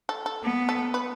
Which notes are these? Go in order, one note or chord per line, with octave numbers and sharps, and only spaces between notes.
A4
A4
B3
A4
B4